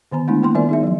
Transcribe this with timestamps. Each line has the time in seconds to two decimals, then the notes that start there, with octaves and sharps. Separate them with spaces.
0.12 D3 D#3 B3 A#5
0.28 G#3 A3 B3 D4 E4
0.43 A3 A#3 C6
0.54 D#3 G3 B3 F4 A#4 D5
0.69 D#4 G#4 E5
0.83 F3 F#3